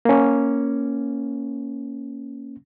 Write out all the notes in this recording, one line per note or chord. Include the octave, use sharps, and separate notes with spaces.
A#3 C#4